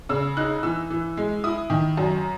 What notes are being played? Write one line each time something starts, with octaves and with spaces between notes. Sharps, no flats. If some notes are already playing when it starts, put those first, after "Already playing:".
C#3 E6
D#4 F#6
E3 E6
E3
G#3
E4 D#6
D#3
F#2